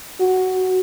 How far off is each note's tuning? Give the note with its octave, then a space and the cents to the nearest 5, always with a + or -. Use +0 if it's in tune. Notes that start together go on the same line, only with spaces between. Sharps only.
F#4 +5